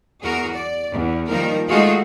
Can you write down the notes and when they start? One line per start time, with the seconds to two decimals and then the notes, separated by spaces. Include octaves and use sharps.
0.24 E2 F#4 G#4 A#4
0.52 D5
0.92 E2
1.28 D#3 F3 G3 A#3 D#4 A#4
1.67 G#3 A3 D#4 F4 F#4 G#4